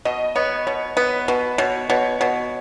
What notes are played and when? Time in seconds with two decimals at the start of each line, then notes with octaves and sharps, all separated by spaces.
0.05 B2 D#5
0.36 B3 C#5
0.67 B2 C#5
0.97 B3 B4
1.28 B2 B4
1.58 B2 C#5
1.90 B2 C#5
2.20 B2 C#5